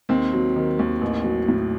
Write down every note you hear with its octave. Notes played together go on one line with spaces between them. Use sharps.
D#2 C4
F#3
D#3
D#2
A1
F#3
A2